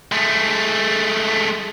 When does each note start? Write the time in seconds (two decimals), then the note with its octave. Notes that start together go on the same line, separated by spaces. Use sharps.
0.12 G#3 A3